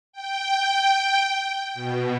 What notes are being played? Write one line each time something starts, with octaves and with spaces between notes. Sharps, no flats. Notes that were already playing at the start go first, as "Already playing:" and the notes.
G5
B2